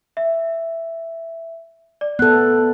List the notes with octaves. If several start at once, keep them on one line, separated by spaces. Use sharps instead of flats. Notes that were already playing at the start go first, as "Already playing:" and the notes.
E5
D5
B3 A4 F#6